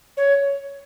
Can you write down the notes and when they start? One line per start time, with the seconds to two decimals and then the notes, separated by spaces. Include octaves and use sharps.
0.17 C#5